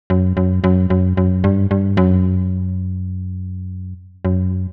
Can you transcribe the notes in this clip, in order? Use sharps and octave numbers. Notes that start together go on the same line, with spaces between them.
F#2
F#2
F#2
F#2
F#2
G2
G2
F#2
F#2